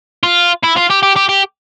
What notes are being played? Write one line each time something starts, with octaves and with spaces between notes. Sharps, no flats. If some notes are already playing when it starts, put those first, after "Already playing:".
F4
E4
F4
G4
G4
G4
G4